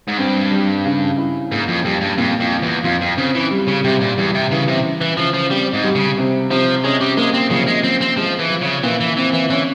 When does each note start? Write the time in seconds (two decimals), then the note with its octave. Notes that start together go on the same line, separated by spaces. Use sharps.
0.08 G#2
0.18 G2 C4
0.51 G3
0.85 C#3
1.18 E4
1.52 G#2 A#3
1.68 F2
1.84 F2 G3
2.01 G2
2.18 F2 A#2
2.40 F2
2.52 F4
2.62 E2
2.84 F2 F4
3.01 F2
3.18 C#3 C4
3.35 E3
3.51 G3
3.68 C#3
3.84 C3 G3
4.01 A#2
4.17 E2 G3
4.35 C3
4.51 C#3 E3
4.68 C3
4.84 C#3
5.01 E3
5.17 C#3 F3
5.34 F3
5.51 G3 C4
5.74 G#2
5.84 G3
5.95 C#3
6.18 C3
6.50 C3 F3
6.84 G#3 C#4
7.01 G3
7.17 G#3 A#3
7.34 C4
7.50 C#3 F3
7.67 G#3
7.83 F3 C4
8.01 C4
8.17 F3 G#3
8.39 E3
8.50 F3
8.61 C#3
8.83 A#2 E3
9.00 E3
9.17 E3 C4
9.33 E3
9.50 E3 C#4